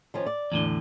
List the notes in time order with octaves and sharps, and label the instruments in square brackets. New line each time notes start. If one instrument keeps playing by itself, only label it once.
[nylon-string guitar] D#3 F3 C#4
D5
[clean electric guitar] E2 A2 D3